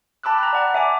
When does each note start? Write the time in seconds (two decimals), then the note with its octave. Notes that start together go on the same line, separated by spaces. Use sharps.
0.23 G5 A5 B5 D6 E6 F#6
0.39 A#5 F#6
0.53 D5 F#5 A5
0.74 E5 G#5 D6